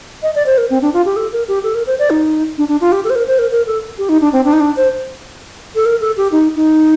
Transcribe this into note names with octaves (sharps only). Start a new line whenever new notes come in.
D#5
D5
C5
A#4
C4
D4
F4
G4
A4
A#4
G4
A4
A#4
C5
D5
D#4
D4
D4
F4
G4
A4
C5
A#4
C5
A#4
A#4
A4
G4
D#4
D4
C4
D4
D#4
D4
C5
A4
A#4
A4
G4
D#4
D#4